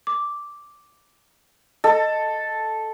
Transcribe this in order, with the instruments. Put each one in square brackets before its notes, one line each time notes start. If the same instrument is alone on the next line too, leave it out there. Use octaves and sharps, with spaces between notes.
[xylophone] D6
[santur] A4 [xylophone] D#5